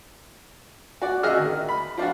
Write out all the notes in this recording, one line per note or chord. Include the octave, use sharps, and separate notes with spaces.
F#4 D5
A1 F#4 G#4 D#5 E5 F6
D#3
B5
F3 D4 F4 F#4